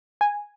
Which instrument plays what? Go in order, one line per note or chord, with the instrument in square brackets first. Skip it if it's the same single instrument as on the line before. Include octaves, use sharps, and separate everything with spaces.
[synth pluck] G#5